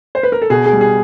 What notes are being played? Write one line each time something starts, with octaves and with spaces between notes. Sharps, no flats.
C5
B4
A#4
A4
B2 G#4
G#4
G3
G#4